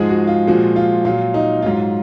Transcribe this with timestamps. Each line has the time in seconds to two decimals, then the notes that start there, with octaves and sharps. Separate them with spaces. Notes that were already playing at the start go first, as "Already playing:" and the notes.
Already playing: G#2 F3 G#3 G#4
0.09 F#4
0.27 F4
0.47 A#2 F3 G#3 F#4
0.76 F4
1.05 A#2 F#3 F4
1.34 D#4
1.62 G#2 F#3 F4